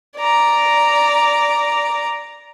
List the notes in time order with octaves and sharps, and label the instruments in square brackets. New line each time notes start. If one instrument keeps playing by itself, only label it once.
[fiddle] D5 A#5